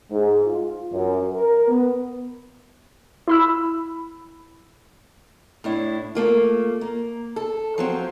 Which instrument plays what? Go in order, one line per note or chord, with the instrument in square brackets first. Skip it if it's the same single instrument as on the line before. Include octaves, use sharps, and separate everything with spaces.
[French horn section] G#2
F4
F#2
A#4
B3
[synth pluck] E4 B5 E6
[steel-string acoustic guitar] A2 D4 E4
A3 A#3 F4
A#3
A4
F3 F#3 C4